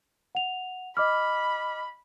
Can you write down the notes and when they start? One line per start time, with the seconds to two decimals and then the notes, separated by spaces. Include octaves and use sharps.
0.35 F#5 F7
0.97 D#5 B5 D6 F6